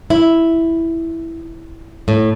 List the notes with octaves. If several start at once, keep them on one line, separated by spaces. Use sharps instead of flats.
E4
A2